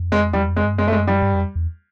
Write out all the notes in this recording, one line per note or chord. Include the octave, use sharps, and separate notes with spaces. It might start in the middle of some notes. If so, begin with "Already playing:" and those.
Already playing: F2
G#3
E2 G3
F2
G#3
G2
F#2 G#3
A3
G#3
G3
G2
F2
E2